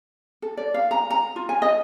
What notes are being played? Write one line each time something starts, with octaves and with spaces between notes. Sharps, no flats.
A4
D5
F5
A#5
A#5
F4
G#5
D#5